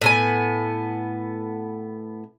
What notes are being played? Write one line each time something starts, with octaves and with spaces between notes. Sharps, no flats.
A2 B3 G#5